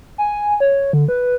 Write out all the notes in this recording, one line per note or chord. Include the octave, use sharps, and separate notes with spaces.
G#5
C#5
D3
B4